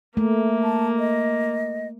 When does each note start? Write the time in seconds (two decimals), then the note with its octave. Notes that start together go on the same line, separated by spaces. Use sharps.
0.17 A3 A#3
0.63 A5
0.99 D#5